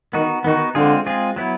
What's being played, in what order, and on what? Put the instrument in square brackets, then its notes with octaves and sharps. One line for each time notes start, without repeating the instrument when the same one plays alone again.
[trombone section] D#3 [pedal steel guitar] B3 D#4 F#4
[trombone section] D#3 [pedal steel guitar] B3 D#4 F#4
[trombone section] D3 [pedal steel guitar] G#3 C4 F4 G#4
[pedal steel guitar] G#3 C4 F4 G#4
F#3 B3 E4